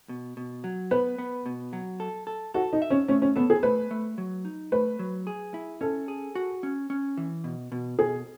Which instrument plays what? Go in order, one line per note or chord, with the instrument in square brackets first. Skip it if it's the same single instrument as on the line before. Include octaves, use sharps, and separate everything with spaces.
[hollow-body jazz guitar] B2
B2
F#3
[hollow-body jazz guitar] B3 [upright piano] B4
[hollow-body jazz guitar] B3
B2
F#3
A4
A4
[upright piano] F#4 [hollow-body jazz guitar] A4
[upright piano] D#4
[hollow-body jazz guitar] E5
[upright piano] C#4
[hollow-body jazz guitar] A3 [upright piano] C#4
[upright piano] C#4
[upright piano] B3 [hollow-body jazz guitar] A4
[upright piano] G#4
[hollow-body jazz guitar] A3 [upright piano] B4
[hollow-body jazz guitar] A3
F#3
D#4
[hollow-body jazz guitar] A3 [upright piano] B4
[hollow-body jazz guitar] F#3
G#4
E4
[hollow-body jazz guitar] C#4 [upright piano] A4
[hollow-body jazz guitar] G#4
F#4
C#4
C#4
E3
B2
B2
[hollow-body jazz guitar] B2 [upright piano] G#4